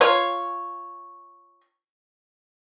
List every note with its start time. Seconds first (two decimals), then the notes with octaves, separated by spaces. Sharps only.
0.01 F4 C#5